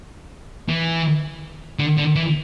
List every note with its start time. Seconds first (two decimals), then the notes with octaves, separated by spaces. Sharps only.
0.69 E3
1.79 D3
1.98 D3
2.16 E3